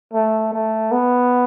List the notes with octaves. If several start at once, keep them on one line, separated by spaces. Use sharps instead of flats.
A3
A3
B3